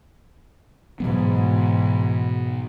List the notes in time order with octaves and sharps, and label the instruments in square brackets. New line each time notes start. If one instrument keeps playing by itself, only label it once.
[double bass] G#2 E3 [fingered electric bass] B2 F#3 B3